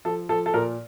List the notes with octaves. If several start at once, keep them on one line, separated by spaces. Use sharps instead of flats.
F3 A4
F3 A4
A4
A#2 A#4